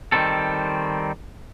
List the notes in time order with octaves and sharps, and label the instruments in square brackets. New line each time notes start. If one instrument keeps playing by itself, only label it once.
[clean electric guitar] D#3 G3 C4 A4